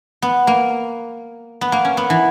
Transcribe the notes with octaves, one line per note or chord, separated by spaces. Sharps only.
B3
A#3
B3
A#3
C#4
B3
E3